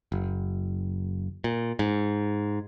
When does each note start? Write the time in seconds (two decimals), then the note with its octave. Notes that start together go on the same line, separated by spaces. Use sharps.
0.12 F#1
1.44 A#2
1.79 G#2